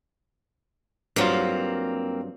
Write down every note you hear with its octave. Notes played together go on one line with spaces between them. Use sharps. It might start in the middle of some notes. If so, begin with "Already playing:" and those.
G2 F#3 A#3 C4 F4